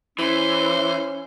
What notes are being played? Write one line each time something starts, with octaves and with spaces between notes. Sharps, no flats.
E3 C#4 C5